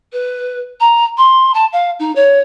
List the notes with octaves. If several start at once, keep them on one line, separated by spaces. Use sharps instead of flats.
B4
A#5
C6
A5
F5
D#4
C#5